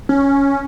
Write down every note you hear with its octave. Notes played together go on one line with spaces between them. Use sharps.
C#4